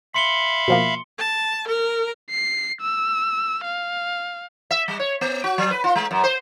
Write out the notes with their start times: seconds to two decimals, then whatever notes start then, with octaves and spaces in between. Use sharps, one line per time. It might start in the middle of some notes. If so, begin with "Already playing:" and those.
0.14 E5 F5 B5 C6 C#7 G7
0.68 B2 F3 A#3
1.19 A5
1.68 A#4
2.30 C7
2.81 E6
3.64 F5
4.71 E5
4.88 G3
4.99 C#5
5.21 B3
5.44 F#4
5.58 F#3
5.71 B4
5.84 F4
5.96 G#3
6.11 F#2
6.24 C5